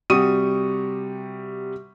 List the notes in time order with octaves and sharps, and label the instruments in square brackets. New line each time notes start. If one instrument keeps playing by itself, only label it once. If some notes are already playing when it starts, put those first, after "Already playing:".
[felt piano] C3 G3 F#4 C#6 D#6 D#7